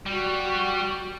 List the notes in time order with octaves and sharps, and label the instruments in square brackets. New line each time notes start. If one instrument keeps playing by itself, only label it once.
[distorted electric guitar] G3 [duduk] F#4